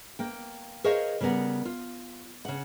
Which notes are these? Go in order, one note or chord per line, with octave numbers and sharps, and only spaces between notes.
A#3 G5
G#4 A#4 C5 C#5 D#5 F5
C#3 G3 B3 A#4 F#5
F4
C#3 F#5